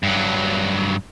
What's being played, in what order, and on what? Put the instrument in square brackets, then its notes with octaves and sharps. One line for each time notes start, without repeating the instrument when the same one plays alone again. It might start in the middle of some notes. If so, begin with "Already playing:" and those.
[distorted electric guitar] G2 F#3